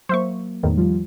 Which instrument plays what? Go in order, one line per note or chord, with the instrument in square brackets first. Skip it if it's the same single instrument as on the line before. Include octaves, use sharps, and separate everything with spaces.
[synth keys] F#3 A#3 [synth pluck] C5 E5 C#6
[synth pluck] E2 A2 D#3
[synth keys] F3 G3 F4